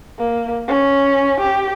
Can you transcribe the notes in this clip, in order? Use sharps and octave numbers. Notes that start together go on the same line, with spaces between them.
A#3
C#4
G4